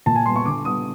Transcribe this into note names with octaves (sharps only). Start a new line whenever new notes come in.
A#2 A5
G#5
G3 B3 C6
C#6
D3 D6
G3 B3 D#6